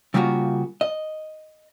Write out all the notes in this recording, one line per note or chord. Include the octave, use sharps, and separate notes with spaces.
C#3 G3 A#3 F4 F#4
D#5